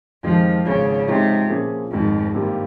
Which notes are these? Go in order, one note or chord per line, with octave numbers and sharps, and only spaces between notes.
F2 D#3 F3 G#3 C4 G4
G#1 G#2 C#3 F3
G#2 C3 F3 C4 D#4
A#2 F3 A#3 C#4 G#4
F1 F2 G#2 D#3
G2 C3 D#3 G3 A#3 F4